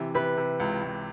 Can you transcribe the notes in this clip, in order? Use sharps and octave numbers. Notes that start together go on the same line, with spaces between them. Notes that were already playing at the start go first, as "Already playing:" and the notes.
Already playing: C3 E3
C3 B4
C3
C#2
C#2